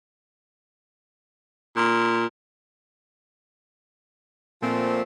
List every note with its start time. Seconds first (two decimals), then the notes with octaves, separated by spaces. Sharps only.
1.76 A#2
4.62 A#2 F3 A3 C4